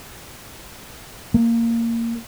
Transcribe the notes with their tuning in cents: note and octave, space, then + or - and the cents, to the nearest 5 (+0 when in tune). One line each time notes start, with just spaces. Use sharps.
A#3 -15